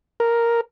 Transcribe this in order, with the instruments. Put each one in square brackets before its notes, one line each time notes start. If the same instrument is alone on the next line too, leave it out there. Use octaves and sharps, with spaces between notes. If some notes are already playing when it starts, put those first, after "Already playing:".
[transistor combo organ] A#4